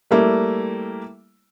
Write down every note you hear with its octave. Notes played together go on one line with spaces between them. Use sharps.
G3 A3 A#3 E4